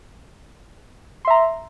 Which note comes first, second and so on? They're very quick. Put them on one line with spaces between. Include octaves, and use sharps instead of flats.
C6 E5 A#5